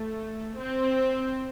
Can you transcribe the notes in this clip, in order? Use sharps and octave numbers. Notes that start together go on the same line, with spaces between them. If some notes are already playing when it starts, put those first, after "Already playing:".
Already playing: A3
C4